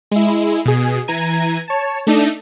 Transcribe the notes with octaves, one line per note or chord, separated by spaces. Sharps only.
G#3 E4
B2 G#4
E3 A#5 G#6 D#7
C#5 A5
A3 D4 D#4 A4